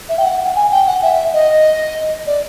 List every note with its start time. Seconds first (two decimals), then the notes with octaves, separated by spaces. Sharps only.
0.09 E5
0.18 G5
0.24 F#5
0.56 G#5
0.71 G5
0.87 F#5
1.02 E5
1.33 D#5
2.26 D5